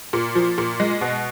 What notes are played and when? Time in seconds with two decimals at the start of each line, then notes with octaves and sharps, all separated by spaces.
0.13 A#2
0.35 F3
0.58 A#2
0.80 G#3
1.01 B2